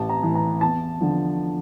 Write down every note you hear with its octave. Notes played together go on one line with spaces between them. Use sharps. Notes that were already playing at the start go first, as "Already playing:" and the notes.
Already playing: A1 A5
A#5
A2 E3
A#5
E2 A5
D3 F3